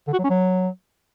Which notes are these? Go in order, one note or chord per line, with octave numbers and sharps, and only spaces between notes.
D3
F#4
F#3
C#4
F#3